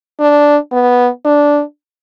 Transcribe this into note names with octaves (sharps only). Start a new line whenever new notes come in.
D4
B3
D4